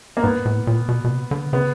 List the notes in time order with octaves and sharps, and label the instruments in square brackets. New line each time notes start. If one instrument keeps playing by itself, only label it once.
[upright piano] A#3
[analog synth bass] G#2 [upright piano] B3
[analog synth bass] A2
A#2
B2
B2
C3
D3
[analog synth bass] C#3 [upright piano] B3